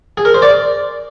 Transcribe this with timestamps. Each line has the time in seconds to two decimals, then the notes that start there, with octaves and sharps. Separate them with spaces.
0.17 G#4
0.25 A#4
0.34 C5
0.42 D5